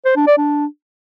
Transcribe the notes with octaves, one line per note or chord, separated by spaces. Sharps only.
C5
D4
D5
D4